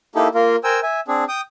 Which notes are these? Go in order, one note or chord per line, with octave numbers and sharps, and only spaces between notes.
A#3 D#4 E4 G4 A4
A#3 F4 A#4
A#4 C5 G5 G#5 E6
E5 G#5
C4 D4 G#4
G5 D#6